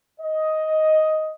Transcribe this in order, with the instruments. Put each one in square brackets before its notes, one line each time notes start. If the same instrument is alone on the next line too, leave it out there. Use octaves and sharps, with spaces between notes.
[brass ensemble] D#5